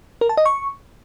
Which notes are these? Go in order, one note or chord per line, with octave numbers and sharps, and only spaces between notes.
A#4
A5
D#5
C#6